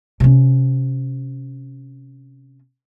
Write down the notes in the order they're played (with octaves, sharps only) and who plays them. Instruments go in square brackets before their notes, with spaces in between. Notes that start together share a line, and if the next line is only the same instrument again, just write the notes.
[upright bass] C3 C#4